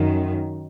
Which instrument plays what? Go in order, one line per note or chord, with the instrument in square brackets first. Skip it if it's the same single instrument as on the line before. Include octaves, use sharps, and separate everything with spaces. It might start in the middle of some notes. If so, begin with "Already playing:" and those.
Already playing: [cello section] F#2 D#3